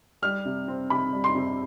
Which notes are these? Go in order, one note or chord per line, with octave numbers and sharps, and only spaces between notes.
G3 F6
C3
C4
C3 B5
G3
C6
C3